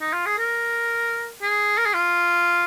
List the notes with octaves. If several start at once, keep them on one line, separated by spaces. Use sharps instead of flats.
D#4
F4
G#4
A#4
G#4
A#4
G#4
F4